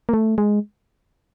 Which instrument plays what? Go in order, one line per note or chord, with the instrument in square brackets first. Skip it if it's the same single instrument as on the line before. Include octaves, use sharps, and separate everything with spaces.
[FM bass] A#3
A3
G#3